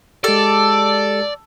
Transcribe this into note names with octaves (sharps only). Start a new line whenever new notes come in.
G#3 G4 A4 D5